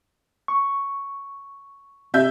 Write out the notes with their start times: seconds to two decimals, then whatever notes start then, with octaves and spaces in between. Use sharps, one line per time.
0.48 C#6
2.14 C3 E5 G6